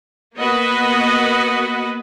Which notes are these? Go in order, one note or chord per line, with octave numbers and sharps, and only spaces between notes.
A#3 B3 F#4 B4 D#5